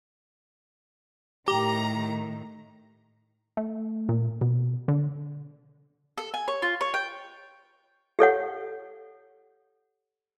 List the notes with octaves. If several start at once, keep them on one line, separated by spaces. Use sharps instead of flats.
A2 D#3 G4 A#5
A3
A#2
B2
D3
A4
G#5
C#5
F4
C#5
G5
G4 A4 C#5 F#5